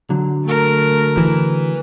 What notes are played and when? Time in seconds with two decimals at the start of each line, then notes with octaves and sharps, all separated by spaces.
0.10 D3 F#3
0.45 A3 A#4
1.17 E3